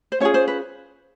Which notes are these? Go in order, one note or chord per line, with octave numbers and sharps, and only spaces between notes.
C5
C#4 F4 G#4 C#5
C5
B4